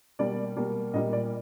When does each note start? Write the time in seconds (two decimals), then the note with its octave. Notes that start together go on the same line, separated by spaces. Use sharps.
0.19 B2 G3 A#3 D5
0.56 B2 G3 A#3
0.94 A#2 G3 A#3 D#5
1.13 D5